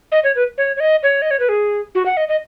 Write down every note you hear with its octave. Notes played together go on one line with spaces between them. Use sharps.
D#5
C#5
B4
C#5
C#5
D#5
C#5
D#5
C#5
B4
G#4
F#4
F#5
D#5
D#5